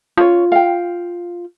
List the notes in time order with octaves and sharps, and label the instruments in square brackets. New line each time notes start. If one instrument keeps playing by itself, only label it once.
[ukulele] C#4 C#5 [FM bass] F4
[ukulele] F5 G5